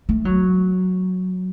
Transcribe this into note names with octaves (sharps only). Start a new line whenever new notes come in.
A3
F#3